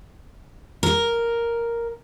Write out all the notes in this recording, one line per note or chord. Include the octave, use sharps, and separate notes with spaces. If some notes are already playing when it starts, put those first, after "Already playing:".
A#4